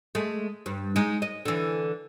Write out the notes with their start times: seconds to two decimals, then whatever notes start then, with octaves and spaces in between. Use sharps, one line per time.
0.15 G#3 A3
0.66 G2
0.96 G#3 D#4
1.22 D#5
1.45 D3 E3